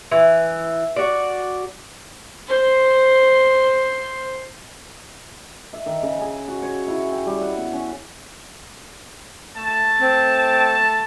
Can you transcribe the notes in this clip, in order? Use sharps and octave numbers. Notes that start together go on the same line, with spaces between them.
E3
F#4 D5
C5 C6
E5
D#3
C#3
G#4
F#4
C#5
E4
G5
G3
F#5
B3
C#4
A3 A5
C4